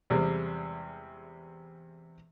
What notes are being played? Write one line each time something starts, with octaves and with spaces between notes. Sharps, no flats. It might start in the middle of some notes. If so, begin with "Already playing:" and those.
E2 C3 G3 G#3 C4